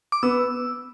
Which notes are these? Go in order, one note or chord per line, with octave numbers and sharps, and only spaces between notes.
D6
B3 E6